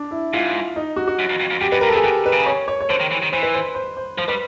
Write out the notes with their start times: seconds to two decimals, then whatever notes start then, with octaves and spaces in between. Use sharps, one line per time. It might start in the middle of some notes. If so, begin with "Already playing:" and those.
Already playing: D4
0.11 E4
0.34 G#2 F4
0.76 D#4
0.96 F#4
1.08 F#4
1.19 F#2
1.30 F2
1.40 F2
1.50 F2
1.61 F#2 G4
1.72 F#2 B4
1.81 G2 A#4
1.89 A4
1.93 A#2
1.96 G#4
2.04 B2 G4
2.26 B4
2.33 C#3
2.46 C#5
2.68 C#5
2.81 C#5
2.90 D3 C5
3.00 D#3
3.11 E3
3.22 D#3
3.32 E3 C5
3.43 B4
3.54 C5
3.75 C5
3.97 C5
4.17 F3 C5
4.28 G3 B4